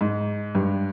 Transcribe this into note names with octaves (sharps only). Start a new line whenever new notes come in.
G#2
G2